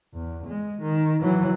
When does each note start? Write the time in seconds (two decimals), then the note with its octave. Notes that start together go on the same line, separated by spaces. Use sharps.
0.14 E2
0.47 G#3
0.82 D#3
1.21 E3 F#3